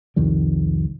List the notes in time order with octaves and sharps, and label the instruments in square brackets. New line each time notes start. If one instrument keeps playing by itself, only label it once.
[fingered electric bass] C2 F2 D#3 G3